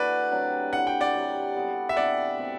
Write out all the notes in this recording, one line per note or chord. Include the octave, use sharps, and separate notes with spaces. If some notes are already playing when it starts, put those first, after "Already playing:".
Already playing: E3 A3 D4 F#4 B4 D5
C3 F#3 A3 D4
D3 A3 E4 F#5
G5
D5 F#5
C3 F#3 C4 G4
G3 B3 F#4 A4
E5
C3 E3 B3 D4 D5 F#5
B2 A3 C4 G4